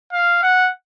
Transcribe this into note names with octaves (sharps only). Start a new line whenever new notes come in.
F5
F#5